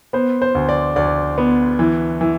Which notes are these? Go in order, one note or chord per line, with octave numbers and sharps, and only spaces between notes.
B3 C5
C5
D2
D5
D2 D5
B3
E3
E3